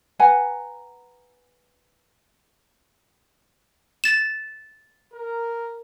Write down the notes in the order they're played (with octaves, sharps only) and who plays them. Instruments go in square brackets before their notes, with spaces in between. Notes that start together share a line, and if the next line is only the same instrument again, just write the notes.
[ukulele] B4 F#5 G#5 A#5
[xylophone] A6 E7
[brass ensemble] A#4